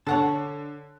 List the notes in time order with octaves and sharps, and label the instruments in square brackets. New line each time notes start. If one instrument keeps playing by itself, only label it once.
[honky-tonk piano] D3 [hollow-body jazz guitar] C#5 F#5 A5